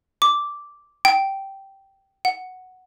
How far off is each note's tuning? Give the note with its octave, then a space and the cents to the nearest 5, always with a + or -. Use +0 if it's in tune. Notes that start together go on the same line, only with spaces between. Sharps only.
D6 -5
G5 -10
F#5 +0